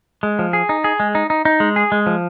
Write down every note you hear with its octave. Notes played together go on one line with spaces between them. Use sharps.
G#3
F3
G#4
D#4
G#4
G#3
D#4
D#4
D#4
G#3
G#4
G#3
F3